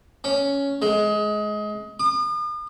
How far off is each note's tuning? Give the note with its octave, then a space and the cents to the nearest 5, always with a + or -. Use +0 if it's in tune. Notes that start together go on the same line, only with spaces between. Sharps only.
C#4 +10
G#3 +20
D#6 -45